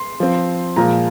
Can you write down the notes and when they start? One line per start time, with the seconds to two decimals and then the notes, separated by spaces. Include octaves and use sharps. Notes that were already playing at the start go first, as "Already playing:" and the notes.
Already playing: C6
0.20 F3 C4
0.76 A#2 F3 G#3 A#5